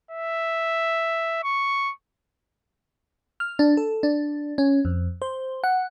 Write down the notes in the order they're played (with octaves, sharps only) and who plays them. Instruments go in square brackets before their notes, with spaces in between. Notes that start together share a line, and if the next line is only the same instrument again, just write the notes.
[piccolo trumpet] E5
C#6
[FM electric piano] F6
D4
A4
D4
C#4
F2
C5
F#5